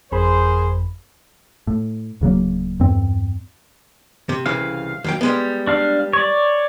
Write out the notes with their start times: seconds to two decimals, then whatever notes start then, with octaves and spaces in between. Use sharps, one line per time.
0.12 G1 F2 G#4 A#4 C5 B5
1.67 A2
2.21 D1 C#3 F#3 A#3
2.80 E2 G2 C4
4.29 C3
4.46 C2 C#3 E3 F5
5.04 D#2 F#3 G5
5.21 G3 G#3 B3
5.67 D4 F5
6.13 C#5 D5